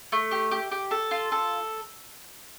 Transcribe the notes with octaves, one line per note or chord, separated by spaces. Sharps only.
A3
G4
G4
G4
A4
F4
A4